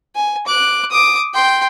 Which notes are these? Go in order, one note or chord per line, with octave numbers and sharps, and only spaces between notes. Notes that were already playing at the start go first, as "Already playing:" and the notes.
G#5
D6 F#6
D6 D#6
G5 C6